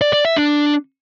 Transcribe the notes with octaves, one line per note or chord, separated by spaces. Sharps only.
D5
D5
E5
D4